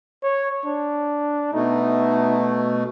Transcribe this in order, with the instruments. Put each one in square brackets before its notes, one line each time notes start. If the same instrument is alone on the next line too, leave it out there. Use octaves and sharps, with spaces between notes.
[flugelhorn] C#5
D4
[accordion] B2 A3 [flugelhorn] D#4